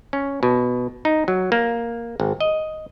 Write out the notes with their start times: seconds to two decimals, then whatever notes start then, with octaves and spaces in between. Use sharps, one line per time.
0.13 C#4
0.43 B2
1.05 D#4
1.28 F#3
1.52 A#3
2.20 G#1
2.40 D#5